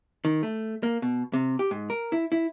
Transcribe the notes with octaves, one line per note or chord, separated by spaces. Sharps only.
D#3
A3
A#3
B2
C3
G4
G#2
A#4
E4
E4